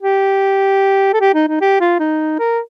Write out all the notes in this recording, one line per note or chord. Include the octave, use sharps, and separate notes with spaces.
G4
A4
G4
D#4
D#4
G4
F4
D#4
A#4